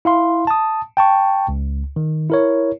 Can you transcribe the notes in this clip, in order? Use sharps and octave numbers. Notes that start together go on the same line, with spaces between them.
E4 F5 C6
A5 D#6
G5 A5 C#6
C#2
D#3
E4 A#4 C#5